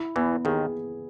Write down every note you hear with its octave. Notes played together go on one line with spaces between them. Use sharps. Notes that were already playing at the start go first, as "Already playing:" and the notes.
Already playing: E4
E2 E3 B3
D#2 D#3 G#4